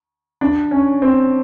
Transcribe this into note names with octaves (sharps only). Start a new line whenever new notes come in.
D4
C#4
C4